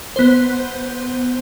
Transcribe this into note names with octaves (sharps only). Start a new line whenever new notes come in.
B3 C5